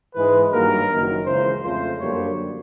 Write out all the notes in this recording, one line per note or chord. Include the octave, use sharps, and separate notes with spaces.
G#2 E3 G#3 B4
G2 D#3 F#3 A#3 A#4
F#1 F#2 D#3
C#2 C#3 E3 C5
F2 C#3 F3 A3 C5
F#2 D3 G3 A#3 C#5